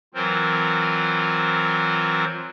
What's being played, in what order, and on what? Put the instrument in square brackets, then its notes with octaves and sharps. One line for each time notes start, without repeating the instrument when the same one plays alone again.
[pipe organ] E3 F#3 C4 F4 A#4 C5